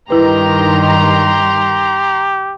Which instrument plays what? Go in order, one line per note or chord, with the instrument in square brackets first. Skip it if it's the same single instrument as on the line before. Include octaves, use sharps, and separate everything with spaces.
[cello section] G2 D#3 [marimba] E4 B4 [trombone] G4 [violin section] A#5 C6